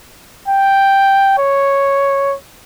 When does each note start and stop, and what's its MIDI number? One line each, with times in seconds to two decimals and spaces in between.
0.48 1.38 79
1.38 2.35 73